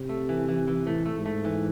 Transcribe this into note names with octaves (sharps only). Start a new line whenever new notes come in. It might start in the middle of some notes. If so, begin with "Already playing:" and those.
Already playing: C3
A3
E3
E3
E3
A2 A3
A3
G#2
A3
E3